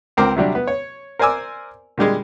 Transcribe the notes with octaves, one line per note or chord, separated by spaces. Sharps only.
C#2 C4 A#4 D6
C3 F#3 G3 D4
B3
C#5
A#4 C5 D5 G#5 D6 E6
A#2 D3 G3 G#3